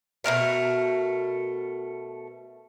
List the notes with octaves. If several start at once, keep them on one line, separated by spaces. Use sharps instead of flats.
B2 A3 A#4 F5